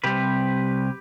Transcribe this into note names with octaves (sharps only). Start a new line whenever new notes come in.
C3 G3 C4 G4 B4